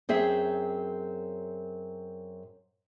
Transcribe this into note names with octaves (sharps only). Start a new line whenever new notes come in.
F#2 C4 G#4 E5